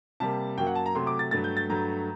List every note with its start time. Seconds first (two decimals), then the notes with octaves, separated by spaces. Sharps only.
0.20 C3 G3 A#3 A5
0.57 F#2 F#3 A#3 G5
0.67 F#5
0.75 A5
0.86 A#5
0.95 C3 F#3 A3 C6
1.07 D6
1.19 A6
1.31 G2 F#3 A3 A6
1.44 G6
1.57 A6
1.69 G2 F#3 A3 A#5